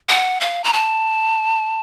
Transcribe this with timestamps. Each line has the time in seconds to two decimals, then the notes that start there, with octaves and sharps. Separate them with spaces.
0.09 F#5
0.41 F5
0.64 A#5
0.73 A5